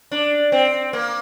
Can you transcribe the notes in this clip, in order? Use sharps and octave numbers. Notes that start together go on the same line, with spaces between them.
D4
C4
A#3